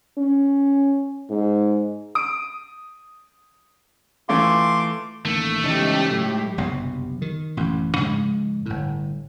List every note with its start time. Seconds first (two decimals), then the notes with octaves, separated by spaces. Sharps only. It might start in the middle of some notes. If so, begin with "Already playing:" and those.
0.18 C#4
1.30 G#2
2.15 D#6 D7
4.29 E3 A3 F4 C6 D6
5.25 A1 D#3 A3 A#3
5.64 G#2 C#3 E3 G#3 C#4 D#4 G4
6.11 A2 F#3
6.57 F#1 B1 G2 C3
7.22 D#3
7.57 A1 F#2
7.96 G#2 C#3 F3 G#3
8.66 G1 A2